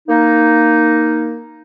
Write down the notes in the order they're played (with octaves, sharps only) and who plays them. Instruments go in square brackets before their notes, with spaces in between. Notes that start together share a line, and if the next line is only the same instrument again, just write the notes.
[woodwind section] A#3 D#4